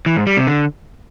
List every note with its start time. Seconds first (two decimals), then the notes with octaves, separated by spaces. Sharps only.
0.06 E3
0.16 G#2
0.27 G3
0.37 C3
0.47 D3